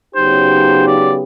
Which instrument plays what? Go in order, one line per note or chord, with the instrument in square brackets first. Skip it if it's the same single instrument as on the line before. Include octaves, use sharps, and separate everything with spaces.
[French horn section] C#3 F#3 B3 D#4 G4 [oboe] C5
[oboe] D5